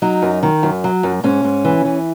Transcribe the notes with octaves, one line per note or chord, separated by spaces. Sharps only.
F#3 D#4
F#2
D#3
F#2
F#3
F#2
G#2 C#4
G#2
E3
E3